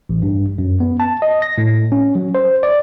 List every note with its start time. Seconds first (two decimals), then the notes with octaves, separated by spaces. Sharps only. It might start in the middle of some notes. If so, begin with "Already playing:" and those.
0.09 A1
0.23 G2
0.58 F#2
0.80 B3
1.00 A5
1.22 D#5
1.42 A#6
1.58 A2
1.92 C#4
2.15 F#3
2.35 C5
2.63 D5